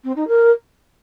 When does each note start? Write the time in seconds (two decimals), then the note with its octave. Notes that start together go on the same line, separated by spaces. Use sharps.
0.04 C4
0.16 D#4
0.28 A#4